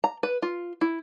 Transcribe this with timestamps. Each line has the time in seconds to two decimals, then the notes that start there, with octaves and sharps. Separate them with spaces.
0.04 A#5
0.23 B4
0.42 F4
0.81 E4